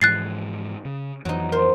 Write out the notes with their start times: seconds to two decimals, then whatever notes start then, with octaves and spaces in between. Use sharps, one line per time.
0.02 G#2 E3 F3 G#5 F#6 A6 C7
0.85 C#3
1.25 F2 E3 F#3 D#4
1.52 A#4 C5